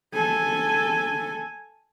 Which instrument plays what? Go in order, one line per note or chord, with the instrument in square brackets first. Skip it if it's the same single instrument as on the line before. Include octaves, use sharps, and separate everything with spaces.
[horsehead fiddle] A4 G#5